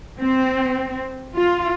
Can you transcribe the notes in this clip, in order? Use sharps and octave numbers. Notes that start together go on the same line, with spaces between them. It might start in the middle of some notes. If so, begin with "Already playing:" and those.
C4
F4